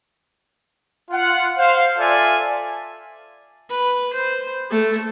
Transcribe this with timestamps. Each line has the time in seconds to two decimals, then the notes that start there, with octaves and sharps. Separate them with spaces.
1.11 F4 F#5
1.58 C5 F5
1.98 F4 A4 D5 E5 G#5
3.70 B4
4.13 C5
4.70 A3